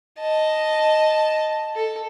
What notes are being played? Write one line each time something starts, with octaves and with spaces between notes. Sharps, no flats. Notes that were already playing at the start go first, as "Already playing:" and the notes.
D#5 A5
A4